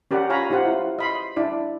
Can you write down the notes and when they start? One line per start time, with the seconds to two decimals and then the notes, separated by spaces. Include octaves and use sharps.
0.11 C#4 G4 A#4 D5 F#5
0.30 F4 C#5 F5 G#5 A#5 B5
0.50 D#4 F4 G4 C5 F#5
0.65 E4
0.99 D#5 B5 C6
1.36 D4 E4 D5